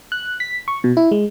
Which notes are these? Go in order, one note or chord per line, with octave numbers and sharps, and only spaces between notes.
F#6
B6
C#6
B2
E4
G#3